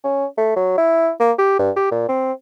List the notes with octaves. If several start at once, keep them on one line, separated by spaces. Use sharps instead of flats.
C#4
A3
F#3
E4
A#3
G4
G2
G4
A#2
C4